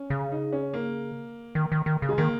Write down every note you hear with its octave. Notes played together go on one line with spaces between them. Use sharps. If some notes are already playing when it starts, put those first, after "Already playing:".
Already playing: C#4
C#3
D#4
C#4
A#3
D#3
D#3
D#3
C#3
G#3
D#3 A#3